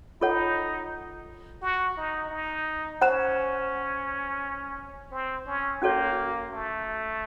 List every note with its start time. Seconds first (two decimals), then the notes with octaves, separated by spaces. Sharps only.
0.21 D#4 F4 A4 C#5 F#5
1.62 F#4
1.97 D#4
2.31 D#4
3.01 C#4 C5 F#5 A#5
5.11 C4
5.46 C#4
5.82 A#3 C#4 F#4 A4 C#5
6.52 A3